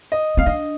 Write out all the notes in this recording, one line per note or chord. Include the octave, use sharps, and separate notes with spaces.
D#5
C4 F5
D4 D#5